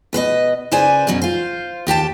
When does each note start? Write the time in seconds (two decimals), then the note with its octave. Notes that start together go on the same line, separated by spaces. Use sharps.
0.13 B2 B4 C5 D#5
0.72 C#3 B4 C5 D5 G#5
1.07 F#2 B2 F#3 C#4
1.22 F4 C5
1.87 D#2 G4 G5 A5